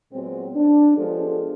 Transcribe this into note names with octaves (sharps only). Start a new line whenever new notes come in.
A#2 F#3 G#3 B3 C4
D4
F3 G#3 B3 G4 A4